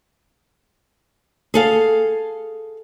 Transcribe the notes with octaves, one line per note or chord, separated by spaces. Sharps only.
G#4 A4 F5